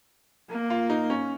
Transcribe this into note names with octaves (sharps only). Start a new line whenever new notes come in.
A#3
F4
D#4
C#4